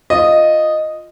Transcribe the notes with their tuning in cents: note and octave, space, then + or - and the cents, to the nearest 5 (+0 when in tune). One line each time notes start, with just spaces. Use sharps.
F4 +0 D#5 -5